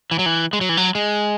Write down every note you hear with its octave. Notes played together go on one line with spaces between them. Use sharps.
E3
F#3
E3
G#3
F#3
E3
F#3
G#3